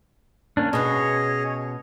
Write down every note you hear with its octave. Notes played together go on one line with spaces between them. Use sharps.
A#3 C#4 D4
B2 C#4 G#4 C#5 D#5